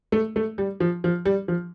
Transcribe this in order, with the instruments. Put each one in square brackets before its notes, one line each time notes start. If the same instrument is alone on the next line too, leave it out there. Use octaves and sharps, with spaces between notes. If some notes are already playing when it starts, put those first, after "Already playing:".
[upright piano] A3
A3
G3
F3
F3
G3
F3